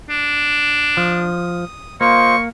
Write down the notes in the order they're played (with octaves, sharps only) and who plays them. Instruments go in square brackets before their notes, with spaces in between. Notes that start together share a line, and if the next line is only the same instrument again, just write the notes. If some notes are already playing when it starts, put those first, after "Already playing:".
[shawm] D4
[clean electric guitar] F3 [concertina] D#6
[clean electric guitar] A#3 [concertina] F4 C5 D#5 [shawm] C#6